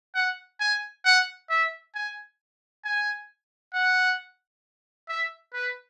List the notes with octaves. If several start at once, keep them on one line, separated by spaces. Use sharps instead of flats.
F#5
G#5
F#5
E5
G#5
G#5
F#5
E5
B4